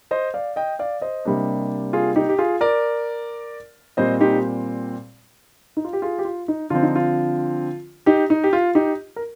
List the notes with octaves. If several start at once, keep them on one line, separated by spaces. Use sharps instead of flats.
C5 D#5
D5 F5
D#5 G5
D5 F5
C5 D#5
C3 G3 A#3 D4
F4 G#4
D#4 G4
G4
F4 G#4
A#4 D5
A#2 G3 C4 C5 D#5
D#4 G4
D#4
F4
G4
F4 G#4
G4
F4
D#4
D3 F3 C4 F4
D#4
F4
D#4 G4
D#4
G4
F4
D#4 G4
A#4